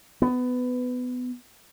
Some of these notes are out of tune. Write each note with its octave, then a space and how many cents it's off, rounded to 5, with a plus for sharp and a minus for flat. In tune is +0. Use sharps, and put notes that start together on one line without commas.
B3 +20